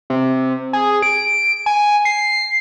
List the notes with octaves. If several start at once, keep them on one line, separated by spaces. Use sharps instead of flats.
C3
G#4
D7
G#5
C7